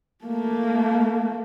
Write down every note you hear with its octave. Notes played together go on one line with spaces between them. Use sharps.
A3 A#3